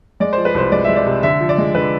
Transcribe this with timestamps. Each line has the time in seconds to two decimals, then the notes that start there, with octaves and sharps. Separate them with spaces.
0.20 G#3 D5
0.33 F3 C5
0.45 B4
0.54 C2 C5
0.72 G#3 D5
0.84 G#3 E5
0.96 D5
1.06 C3
1.23 D3 E5
1.40 F3
1.49 D5
1.58 G#3
1.75 D3 B4